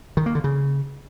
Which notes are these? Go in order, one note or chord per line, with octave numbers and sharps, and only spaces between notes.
D#3
A#3
D3
C#3